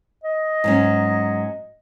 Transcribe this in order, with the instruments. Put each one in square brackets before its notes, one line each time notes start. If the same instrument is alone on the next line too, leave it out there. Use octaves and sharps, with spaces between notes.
[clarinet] D#5
[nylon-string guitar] G#2 F#3 C#4